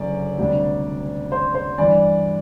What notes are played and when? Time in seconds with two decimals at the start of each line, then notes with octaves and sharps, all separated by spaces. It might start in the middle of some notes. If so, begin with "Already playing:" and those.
Already playing: F#1 F#2 D3 D5
0.38 D2 C3 G3 D4
1.32 C5
1.55 C5
1.78 G2 E3 G3 D4 D5